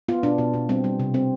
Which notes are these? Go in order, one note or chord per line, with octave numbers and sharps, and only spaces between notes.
B3 F4
B2 D4
B2
B2
G3 C4
G3
C3
C4